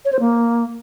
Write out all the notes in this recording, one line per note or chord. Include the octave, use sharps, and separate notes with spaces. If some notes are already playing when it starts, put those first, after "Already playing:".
C#5
C5
A#3